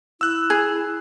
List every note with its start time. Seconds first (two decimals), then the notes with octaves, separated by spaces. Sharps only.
0.21 E4 E6 F#6
0.50 G#4